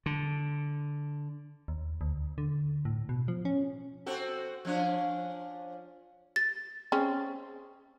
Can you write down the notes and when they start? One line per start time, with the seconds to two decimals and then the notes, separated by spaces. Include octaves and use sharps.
0.06 D3
1.68 D#2
2.01 D2
2.38 D3
2.85 A2
3.09 B2
3.28 F3
3.45 C#4
4.06 C4 F#4 A4
4.65 F3 C#4 D4
6.36 A6
6.92 C4 C#4 G#4